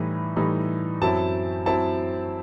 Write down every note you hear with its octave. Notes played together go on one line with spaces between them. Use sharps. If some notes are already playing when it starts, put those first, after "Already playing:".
Already playing: A2 E3 G3 D#4 B5
A2 E3 G3 D#4
F#2 F#3 C4 E4 A5
F#3 C4 E4 A5